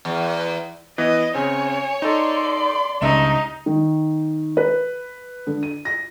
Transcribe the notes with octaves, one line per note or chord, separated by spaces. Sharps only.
E2
E3 B3 D#5
C#3 C4 C#5 G#5
D#4 A4 D5 C6
C#2 G2 C#3 D#4 E5 E7
D#3
B4
D3
D#7
A#6